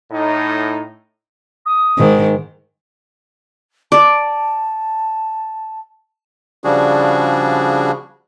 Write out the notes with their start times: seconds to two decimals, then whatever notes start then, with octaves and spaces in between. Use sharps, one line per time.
0.11 A2 D#4
1.66 D#6
1.98 G#2 D#3
3.92 D5 A5
6.64 C#3 F3 G3 D4 F#4 G#4